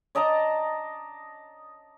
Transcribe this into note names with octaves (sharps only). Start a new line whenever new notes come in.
D5 D#5 A5 A#5